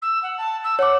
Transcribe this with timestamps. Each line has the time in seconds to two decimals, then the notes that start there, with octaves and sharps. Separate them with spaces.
0.02 E6
0.22 F#5
0.37 A5
0.64 E6
0.79 C#5 F#5 D6